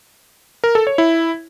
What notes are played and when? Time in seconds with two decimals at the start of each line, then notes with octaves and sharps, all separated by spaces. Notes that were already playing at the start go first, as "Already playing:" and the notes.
0.64 A#4
0.75 A4
0.87 C#5
0.98 E4